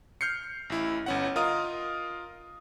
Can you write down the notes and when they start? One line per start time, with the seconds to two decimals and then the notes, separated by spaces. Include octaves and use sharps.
0.21 F6 G6 C7 C#7
0.70 A1 E4
1.06 G1 C#4 F#5
1.36 F4 A#4 D#5 F5 D#6